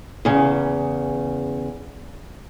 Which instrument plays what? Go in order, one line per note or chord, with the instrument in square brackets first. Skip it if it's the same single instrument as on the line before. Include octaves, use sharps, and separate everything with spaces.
[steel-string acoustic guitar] E2 C#3